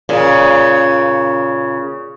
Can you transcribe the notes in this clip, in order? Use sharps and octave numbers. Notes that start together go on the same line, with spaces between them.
A#2 C#3